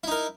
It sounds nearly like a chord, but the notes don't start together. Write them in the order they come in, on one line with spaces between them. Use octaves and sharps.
E4 D#4 A#4